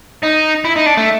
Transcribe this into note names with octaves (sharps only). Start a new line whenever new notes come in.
D#4
E4
D#4
D4
A3